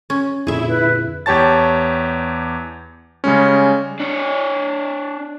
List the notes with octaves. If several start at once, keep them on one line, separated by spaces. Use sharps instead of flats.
C#4
F2 A#2 D3 E4 G#4 E5
B4
E2 G4 C#5 A5 A6
C#3 G3 G#3 C#4
D4 C#5